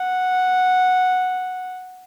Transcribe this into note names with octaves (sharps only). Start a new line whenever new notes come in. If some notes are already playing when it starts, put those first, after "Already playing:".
Already playing: F#5